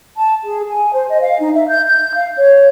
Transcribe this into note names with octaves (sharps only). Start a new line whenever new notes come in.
A5
G#4
G#5
C5
D#5
F5
D#4
E5
G6
G6
F5
C#5